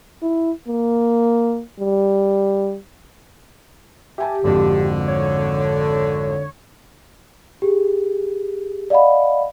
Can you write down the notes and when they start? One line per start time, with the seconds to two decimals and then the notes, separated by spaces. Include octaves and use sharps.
0.22 E4
0.68 A#3
1.79 G3
4.18 G4 E5 G#5 A5
4.44 G#1 F2 D3
5.08 C#5
7.62 G4 G#4
8.90 D5 D#5 F5 F#5 B5